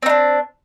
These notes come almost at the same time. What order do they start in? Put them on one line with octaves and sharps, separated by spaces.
C4 D#4 D4